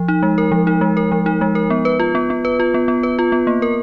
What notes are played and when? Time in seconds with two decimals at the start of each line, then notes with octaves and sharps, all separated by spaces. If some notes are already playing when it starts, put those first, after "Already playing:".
Already playing: F3
0.08 D#4
0.23 G#3
0.38 A#4
0.52 F3
0.67 D#4
0.81 G#3
0.97 A#4
1.12 F3
1.26 D#4
1.41 G#3
1.55 A#4
1.70 B3
1.85 B4
2.00 F4
2.15 B3
2.30 B3
2.45 B4
2.60 F4
2.74 B3
2.88 B3
3.03 B4
3.19 F4
3.32 B3
3.47 A#3
3.62 A#4